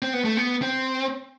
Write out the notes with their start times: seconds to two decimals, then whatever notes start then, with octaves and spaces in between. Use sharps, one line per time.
0.02 C4
0.13 B3
0.25 A3
0.37 B3
0.62 C4